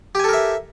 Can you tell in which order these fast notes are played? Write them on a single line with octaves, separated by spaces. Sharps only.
G4 G#5 A4 A#4 E5